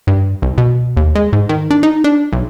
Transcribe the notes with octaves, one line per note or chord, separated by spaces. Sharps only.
G2
C2
B2
D#2
G#3
G#2
D#3
D4
D#4
D4
B1